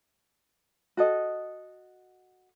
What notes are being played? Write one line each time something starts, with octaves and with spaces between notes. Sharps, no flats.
F#4 A4 D#5